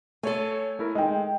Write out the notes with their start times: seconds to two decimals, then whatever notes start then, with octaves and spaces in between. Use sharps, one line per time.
0.23 A3 A4 C#5 G#5
0.79 A3 E4 A#4
0.95 G#3 D#5 G5